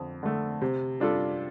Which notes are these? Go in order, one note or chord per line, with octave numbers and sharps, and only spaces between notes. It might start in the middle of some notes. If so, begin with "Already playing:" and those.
Already playing: F2 D3
D3 A3
C3
G3 D4 F4 A4